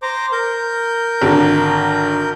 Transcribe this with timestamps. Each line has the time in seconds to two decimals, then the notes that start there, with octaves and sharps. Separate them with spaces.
0.02 C5 A#5 D6
0.32 A#4 G6
1.22 G#1 D3